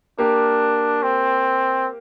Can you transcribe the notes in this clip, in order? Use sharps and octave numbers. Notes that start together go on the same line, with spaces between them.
A#3 D4 G4 A#4
C4